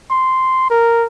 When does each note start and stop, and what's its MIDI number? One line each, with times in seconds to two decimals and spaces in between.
0.11 0.68 84
0.70 1.06 70